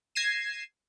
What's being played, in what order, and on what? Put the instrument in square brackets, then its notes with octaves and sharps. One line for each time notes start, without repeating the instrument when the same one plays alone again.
[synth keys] G#6 A#6 C7 D#7 E7